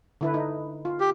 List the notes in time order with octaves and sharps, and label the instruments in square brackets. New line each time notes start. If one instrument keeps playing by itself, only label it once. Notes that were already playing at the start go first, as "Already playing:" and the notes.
[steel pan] D3 E4 B4
D#4
F4
[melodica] G4